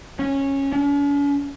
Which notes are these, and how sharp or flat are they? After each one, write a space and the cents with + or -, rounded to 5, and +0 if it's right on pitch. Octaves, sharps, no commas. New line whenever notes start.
C#4 -15
C#4 +45